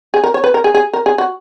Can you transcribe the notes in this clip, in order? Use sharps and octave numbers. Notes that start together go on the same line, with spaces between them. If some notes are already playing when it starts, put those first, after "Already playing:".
G#4
A#4
C#5
B4
A#4
G#4
G#4
A#4
G#4
F#4